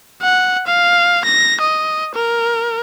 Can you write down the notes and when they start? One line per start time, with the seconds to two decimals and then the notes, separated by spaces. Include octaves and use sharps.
0.22 F#5
0.67 F5
1.24 A#6
1.61 D#5
2.15 A#4